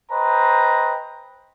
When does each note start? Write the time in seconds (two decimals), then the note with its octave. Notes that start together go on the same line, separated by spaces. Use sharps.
0.11 B4 C5 D#5 G5 A#5